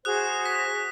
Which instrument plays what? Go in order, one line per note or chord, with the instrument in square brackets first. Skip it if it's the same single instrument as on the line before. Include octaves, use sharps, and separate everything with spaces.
[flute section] F#4 G#4 C5 [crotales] D#6 F#6
[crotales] B6